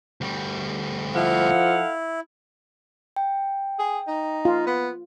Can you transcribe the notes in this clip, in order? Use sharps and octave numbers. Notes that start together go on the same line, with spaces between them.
D2 G3
F3 E4 A4 F5 F#5
G5
G#4
D#4
F4
B3